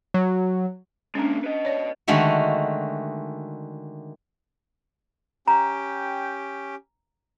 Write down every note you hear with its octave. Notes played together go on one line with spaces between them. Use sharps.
F#3
G#3 A#3 C#4 D4
B4 D#5
C#5 D5
D3 D#3 G#3 A3 F#4
C#4 G4 G5 A#5